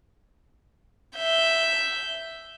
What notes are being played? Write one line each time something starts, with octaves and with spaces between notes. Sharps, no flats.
E5 G6